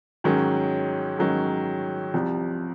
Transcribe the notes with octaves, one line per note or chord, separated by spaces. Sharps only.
G#2 D#3 F#3 C#4
G#2 D#3 F#3 C#4
C2 C3 F3